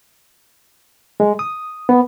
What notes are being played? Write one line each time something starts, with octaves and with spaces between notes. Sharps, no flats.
G#3
D#6
B3